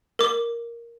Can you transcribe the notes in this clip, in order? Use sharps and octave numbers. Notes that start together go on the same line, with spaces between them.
A#4 D6